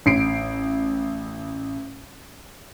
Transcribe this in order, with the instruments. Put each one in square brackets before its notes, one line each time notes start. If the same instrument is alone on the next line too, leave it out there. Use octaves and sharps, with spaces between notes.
[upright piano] A1 C7 D7